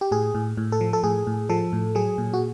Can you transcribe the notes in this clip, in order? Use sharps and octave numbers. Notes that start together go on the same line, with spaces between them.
G4
A2 G#4
A2
A2
A4
F3
A4
A2 G#4
A2
F3 A4
A2
F#3 G#4
A#2
F#4